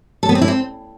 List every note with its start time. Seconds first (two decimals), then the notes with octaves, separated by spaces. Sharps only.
0.23 A4
0.29 B3
0.35 C4
0.42 E4
0.48 C4